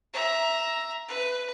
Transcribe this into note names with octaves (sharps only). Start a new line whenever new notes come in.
E5 A#5
B4